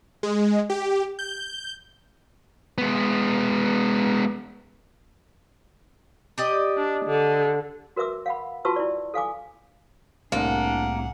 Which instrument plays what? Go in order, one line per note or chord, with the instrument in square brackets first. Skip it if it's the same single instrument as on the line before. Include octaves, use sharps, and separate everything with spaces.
[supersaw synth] G#3
G4
G6
[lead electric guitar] G#3 B3
[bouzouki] G4 D5 D#5
[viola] D4
D3
[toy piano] F#4 A#4 B4 E5 D6 E6
F5 F#5 B5
F4 F#4 B4 A5 C#6 E6
E4 D5
A4 F5 G#5 D6
[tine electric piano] C2 A2 C3 [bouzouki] A#3 [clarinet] D4 [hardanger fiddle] G#4 F#5